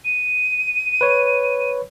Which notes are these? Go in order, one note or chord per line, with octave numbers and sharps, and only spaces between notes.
D#7
B4 C#5